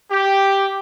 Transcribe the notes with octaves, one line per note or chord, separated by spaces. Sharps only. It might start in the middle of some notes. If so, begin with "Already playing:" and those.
G4